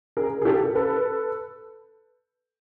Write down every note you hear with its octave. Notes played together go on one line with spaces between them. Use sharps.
G#4 A#4
G#4
G4 A4
A4 B4